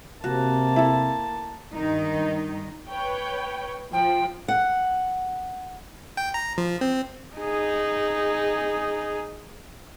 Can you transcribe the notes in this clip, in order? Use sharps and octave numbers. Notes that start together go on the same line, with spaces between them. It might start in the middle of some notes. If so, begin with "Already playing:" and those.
C3 A#3 F#4 A5
E4 A4
G2 D#3 D#4
B4 C#5 G5
F3 G5
F#5
G5
A#5
F3
C4
D#4 G#4